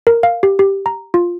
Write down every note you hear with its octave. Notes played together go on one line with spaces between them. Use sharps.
A#4
F5
G4
G4
A#5
F4